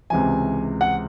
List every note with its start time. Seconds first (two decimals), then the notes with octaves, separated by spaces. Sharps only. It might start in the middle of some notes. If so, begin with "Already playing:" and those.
0.10 C#2 C3 E3 G#5
0.81 F#5